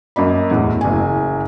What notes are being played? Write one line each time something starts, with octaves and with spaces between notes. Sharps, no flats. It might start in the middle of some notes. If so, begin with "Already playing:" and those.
F#2 A#3 D#5 B5
E2 A2
F#1 G#5